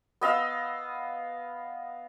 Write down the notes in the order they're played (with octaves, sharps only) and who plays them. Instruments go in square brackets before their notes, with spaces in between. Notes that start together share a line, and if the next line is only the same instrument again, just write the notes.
[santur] B3 D#5 F5 E6